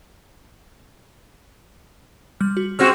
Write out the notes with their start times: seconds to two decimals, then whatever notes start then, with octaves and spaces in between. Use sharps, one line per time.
2.41 G3 F6
2.57 F#4
2.79 G#3 C4 F#4 C#6 E6 F6